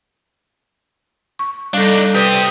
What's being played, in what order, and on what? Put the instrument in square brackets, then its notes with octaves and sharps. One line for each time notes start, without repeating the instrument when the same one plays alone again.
[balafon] C#6
[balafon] G3 A4 [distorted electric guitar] D4 D#4
[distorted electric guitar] C4 G4 [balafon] B4 [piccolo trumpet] D#6